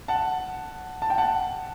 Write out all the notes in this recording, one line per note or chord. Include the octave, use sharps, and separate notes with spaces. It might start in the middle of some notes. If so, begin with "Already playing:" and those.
F#5 A5
A5
G5
F#5 A5